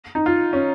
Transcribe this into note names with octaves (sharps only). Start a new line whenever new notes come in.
D#4
F4
C#4